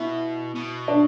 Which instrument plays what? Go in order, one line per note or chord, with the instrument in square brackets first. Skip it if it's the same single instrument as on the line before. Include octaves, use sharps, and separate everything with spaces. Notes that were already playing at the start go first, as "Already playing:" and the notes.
Already playing: [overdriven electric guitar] B2 [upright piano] E4
[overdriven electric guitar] B2
[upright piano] D4